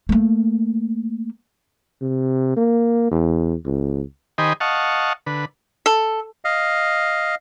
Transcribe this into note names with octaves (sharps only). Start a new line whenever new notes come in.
A3 A#3
C3
A#3
E2
C#2
D#3 G4 C5 D#5 G#5 B5
D#5 F5 F#5 A5 C#6
D3 B4
A4
D#5 F5